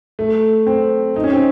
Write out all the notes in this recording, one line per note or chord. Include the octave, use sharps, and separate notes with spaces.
A3
C4
D#4
C#4
C4